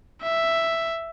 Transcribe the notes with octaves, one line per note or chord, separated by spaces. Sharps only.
E5